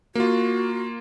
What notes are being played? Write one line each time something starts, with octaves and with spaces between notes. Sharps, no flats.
A#3 F4 F#4